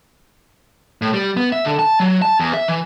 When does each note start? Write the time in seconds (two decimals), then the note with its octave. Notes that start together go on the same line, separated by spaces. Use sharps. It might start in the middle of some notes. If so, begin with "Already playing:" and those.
1.02 A2
1.13 G3
1.37 B3
1.52 E5
1.65 D3
1.79 A5
2.00 F#3
2.22 A5
2.39 E2
2.54 E5
2.68 E3